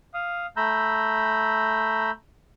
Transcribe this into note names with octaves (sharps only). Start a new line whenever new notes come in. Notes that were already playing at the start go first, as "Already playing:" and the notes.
F5 D#6
A3 A#5 B5 E6 G6